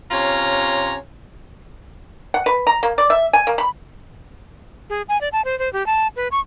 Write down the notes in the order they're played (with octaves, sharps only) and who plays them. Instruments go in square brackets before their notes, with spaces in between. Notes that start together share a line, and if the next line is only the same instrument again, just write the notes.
[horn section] C3 C#4 F4 C#5 A#5
[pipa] F#5
B4
A#5
A#3
D5
E5
G#5
A#3
B5
[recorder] G#4
G#5
D5
A5
C5
C5
G4
A5
B4
C#6